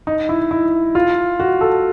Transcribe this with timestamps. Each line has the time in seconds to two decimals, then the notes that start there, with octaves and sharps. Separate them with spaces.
0.07 D#4
0.29 E4
0.51 E4
0.95 F4
1.40 F#4
1.61 A4